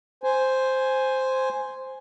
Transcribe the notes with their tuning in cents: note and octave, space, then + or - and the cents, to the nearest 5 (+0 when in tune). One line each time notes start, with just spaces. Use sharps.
C5 +0 G#5 +0